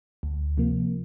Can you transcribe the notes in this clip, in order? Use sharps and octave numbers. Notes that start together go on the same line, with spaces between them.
D2
C3 F3 A#3